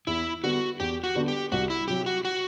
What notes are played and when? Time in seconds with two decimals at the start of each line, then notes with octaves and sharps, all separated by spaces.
0.07 E2 E4
0.43 D3 G3 B3 D4 F#4
0.80 E2 G4
1.04 F#4
1.15 D3 G3 B3 D4
1.28 G4
1.52 C2 F#4
1.70 E4
1.88 C3 F#3 G4
2.06 F#4
2.25 F#4